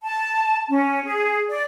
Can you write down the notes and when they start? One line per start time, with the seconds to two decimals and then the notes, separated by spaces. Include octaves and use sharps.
0.03 A5
0.69 C#4
1.04 G#4
1.48 D5